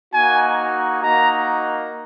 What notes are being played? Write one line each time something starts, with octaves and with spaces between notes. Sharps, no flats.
A#3 D#4 F#4 G#5
A#3 D#4 F#4 A#5